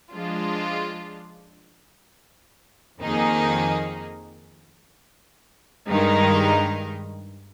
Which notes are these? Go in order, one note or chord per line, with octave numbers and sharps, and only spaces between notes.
F3 G#3 D4 F4
F2 D#3 A#3 D#4 G#4
G2 D#3 G#3 D#4 A#4